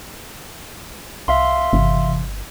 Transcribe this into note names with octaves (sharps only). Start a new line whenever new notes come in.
C2 E5 F5 C6
G1 C3 E3